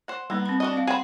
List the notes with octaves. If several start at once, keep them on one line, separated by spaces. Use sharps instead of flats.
C5 F#5
G3 A#3 B3 D#4
C4 B5
D4 F#4 D#5
C4 F5
G#4 C5 F#5 G5 B5